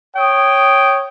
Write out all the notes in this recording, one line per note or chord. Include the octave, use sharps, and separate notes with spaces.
C#5 G5 D#6